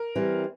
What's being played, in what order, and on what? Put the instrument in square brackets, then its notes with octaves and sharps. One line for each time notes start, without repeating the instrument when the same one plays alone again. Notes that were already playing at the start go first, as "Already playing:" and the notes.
Already playing: [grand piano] A#4
[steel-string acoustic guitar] E3 G3 C4